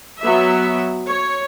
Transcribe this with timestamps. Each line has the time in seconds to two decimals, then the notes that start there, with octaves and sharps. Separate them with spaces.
0.21 F#3 B3 E5
1.06 C#5